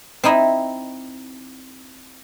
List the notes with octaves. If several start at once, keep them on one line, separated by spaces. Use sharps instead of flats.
C4 D#4 E4 D#5